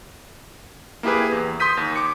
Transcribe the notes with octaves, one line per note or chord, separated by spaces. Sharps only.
A#3 E4 G4 G#4 B4
E2
C6 D#6 G6 B6 D#7
D#2
D6 C#7